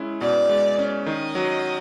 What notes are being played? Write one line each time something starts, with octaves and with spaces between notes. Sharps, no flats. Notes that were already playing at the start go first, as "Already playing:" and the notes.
Already playing: G#3 C#4 E4
B2 D5
G#3
C#4
D#3 D#5
F#3